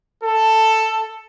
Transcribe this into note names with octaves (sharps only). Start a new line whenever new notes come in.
A4